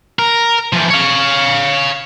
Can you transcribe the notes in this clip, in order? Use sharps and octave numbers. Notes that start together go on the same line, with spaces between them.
A#4
E3 F3
C#5 F5